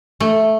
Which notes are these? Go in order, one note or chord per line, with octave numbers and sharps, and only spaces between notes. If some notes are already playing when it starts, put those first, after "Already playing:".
A3